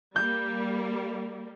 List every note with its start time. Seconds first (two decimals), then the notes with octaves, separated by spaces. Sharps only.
0.16 G3 A#3 G6